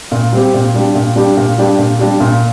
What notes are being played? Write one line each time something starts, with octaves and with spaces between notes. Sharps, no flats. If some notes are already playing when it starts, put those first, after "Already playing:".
A#2
G3 C4 G4
A#2
G3 D4 G4
A#2
G3 D4 G4
A#2
G3 D4 G4
A#2
G3 D4 G4
A#2